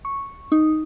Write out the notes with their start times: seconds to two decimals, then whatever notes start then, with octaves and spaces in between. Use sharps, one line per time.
0.05 C#6
0.52 D#4